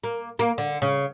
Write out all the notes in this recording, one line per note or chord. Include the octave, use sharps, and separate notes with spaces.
A#3
A#3
D3
C#3